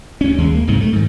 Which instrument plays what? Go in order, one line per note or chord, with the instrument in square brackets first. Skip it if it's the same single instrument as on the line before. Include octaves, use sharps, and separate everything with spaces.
[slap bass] D2 C#4
D#2 G#3
A#3
B1 G#2 C3 D#3
A3
G#2 D#3